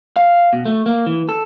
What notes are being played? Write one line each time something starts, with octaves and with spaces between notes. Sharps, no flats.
F5
B2
A3
A#3
E3
A4